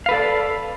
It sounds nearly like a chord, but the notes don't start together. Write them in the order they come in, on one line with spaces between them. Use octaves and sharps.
F5 B4 A4 D5